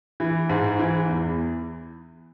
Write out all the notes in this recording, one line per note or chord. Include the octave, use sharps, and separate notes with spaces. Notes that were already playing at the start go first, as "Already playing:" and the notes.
E3
G#2
E3
E2